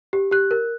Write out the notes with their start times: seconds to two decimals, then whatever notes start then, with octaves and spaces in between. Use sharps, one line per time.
0.13 G4
0.31 G4 F#6
0.51 A#4